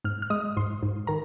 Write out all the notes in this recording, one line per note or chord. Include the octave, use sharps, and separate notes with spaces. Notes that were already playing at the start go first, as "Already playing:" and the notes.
G#2 F6
F6
G#3 D#6
G#2 C6
G#2
D#3 A#5